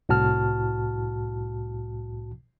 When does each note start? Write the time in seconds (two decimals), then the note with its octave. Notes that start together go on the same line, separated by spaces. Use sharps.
0.09 C2 A2 F#4 A5 F6